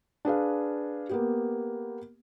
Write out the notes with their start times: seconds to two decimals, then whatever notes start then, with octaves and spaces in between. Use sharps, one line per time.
0.25 D4 G#4 B4 F5
1.09 A#3 B3 G4